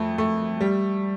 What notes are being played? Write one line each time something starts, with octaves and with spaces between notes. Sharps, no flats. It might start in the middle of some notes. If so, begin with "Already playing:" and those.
Already playing: F2 A3
A3
G3